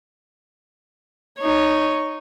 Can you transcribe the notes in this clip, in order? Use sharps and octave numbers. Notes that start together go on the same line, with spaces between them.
D#4 C#5